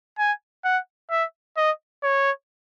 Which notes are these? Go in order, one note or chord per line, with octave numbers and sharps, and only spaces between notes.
G#5
F#5
E5
D#5
C#5